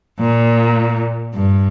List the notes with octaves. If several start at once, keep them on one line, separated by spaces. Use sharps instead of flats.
A#2
G2